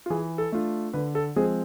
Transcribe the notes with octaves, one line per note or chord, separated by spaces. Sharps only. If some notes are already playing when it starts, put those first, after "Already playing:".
F4
E3 G#4
A4
A3 D4 F4
D3 B4
A4
F3 G#3 C4 G#4